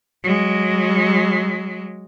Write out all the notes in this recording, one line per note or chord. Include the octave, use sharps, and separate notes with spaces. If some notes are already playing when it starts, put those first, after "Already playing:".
F#3 G#3